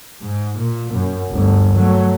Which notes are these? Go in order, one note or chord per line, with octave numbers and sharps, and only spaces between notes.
G#2
A#2
F#2
G1 D2
F#3 A3